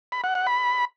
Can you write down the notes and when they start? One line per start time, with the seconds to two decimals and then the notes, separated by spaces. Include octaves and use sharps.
0.12 B5
0.24 F#5
0.35 F#5
0.47 B5